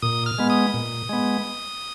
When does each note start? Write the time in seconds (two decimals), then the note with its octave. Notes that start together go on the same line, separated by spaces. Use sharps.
0.02 A#2 D#6
0.26 F6
0.38 G#3 B3
0.50 D#6
0.74 A#2
1.09 G#3 B3